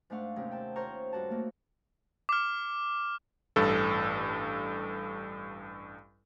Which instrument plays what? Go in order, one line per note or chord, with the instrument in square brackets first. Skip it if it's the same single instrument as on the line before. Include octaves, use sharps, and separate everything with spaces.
[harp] G#2 A3 D4 F5 F#5 C#6
D#2 C3 C#4 D#4
G5 A5
F4 A#4 C5 C#5 A#5 C#6
G2 F#4 A5
A3 A#3
[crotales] D6 F6
[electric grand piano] A1 G2 A4